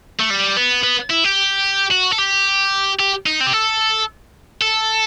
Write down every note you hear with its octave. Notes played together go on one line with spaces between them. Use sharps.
A3
G3
B3
B3
E4
G4
F#4
A4
G4
G4
D#4
C4
G4
A4
A4